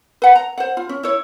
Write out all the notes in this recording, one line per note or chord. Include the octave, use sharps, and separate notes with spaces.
B4 F#5
A#5
C5 F#5
F4
C#4
E4 C#5